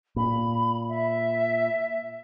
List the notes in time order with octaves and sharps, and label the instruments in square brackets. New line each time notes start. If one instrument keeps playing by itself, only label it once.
[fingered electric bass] A#2 [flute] B5
[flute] E5